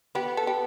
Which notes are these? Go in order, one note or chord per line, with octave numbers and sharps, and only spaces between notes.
B3 G4
A4
G4